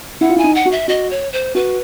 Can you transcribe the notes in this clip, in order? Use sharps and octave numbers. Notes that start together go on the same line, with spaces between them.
E4 F#5
F4
E4 G#5
D#4
F#5
F#4
E5
F#4 D#5
C#5
C5
F#4 B4